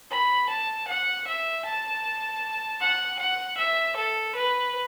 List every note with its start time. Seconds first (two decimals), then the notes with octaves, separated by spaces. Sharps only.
0.11 B5
0.49 A5
0.88 F#5
1.27 E5
1.65 A5
2.81 F#5
3.20 F#5
3.58 E5
3.96 A4
4.36 B4